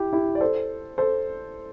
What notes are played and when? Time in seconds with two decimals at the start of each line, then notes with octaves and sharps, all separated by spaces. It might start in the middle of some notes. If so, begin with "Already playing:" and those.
Already playing: E4 G4
0.13 E4 G4
0.35 D5
0.41 A4 C5
0.98 A4 C5